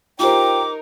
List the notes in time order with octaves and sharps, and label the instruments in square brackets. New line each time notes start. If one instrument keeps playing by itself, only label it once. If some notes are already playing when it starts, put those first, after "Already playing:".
[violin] D#4 A#4 [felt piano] F4 G4 C5 [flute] G5 [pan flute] D6